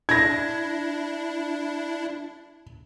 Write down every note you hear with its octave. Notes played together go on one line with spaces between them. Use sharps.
D4 E4 G#6 A#6